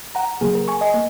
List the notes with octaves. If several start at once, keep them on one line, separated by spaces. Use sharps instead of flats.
F#5 A#5
C#3 F#3 A#3 G#4
A#4
G#5 C#6
D#5 G#5
A#3